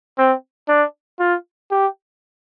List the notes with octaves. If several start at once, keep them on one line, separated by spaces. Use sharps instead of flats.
C4
D4
F4
G4